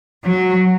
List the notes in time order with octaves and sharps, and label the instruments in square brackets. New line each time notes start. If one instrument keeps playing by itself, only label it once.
[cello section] F#3